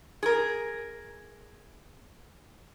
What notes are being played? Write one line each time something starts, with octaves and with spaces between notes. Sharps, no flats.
G#4 A#4